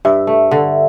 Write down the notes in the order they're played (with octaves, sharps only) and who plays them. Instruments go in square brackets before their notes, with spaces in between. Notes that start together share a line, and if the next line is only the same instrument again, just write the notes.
[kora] G2 [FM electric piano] E5
[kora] A3
D3